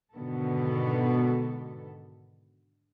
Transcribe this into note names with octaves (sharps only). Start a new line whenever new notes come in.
G#2 B2 D3 D#3 B3 A4